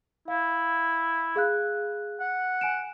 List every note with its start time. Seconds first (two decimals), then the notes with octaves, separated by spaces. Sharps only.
0.28 E4 F5
1.36 G#4 F5 F#6
2.20 F#5
2.61 G#5 D7 E7